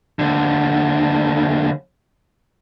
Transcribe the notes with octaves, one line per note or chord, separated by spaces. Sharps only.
D#2 D3